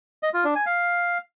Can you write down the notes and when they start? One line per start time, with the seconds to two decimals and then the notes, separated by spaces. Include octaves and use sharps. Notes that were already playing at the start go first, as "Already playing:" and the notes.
0.23 D#5
0.34 F4
0.45 D4
0.55 G#5
0.66 F5